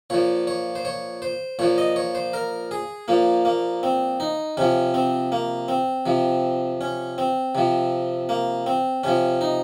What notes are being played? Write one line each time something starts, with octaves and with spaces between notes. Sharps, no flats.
A#2 F3 C#5
C#5
C5
C#5
C5
A#2 F3 C#5
D#5
C#5
C5
A#4
G#4
A#2 F3 A#3
A#3
C4
D#4
C3 F3 C#4
C4
A#3
C4
C3 F3
C#4
C4
C3 F3
A#3
C4
C3 F3 C#4
D#4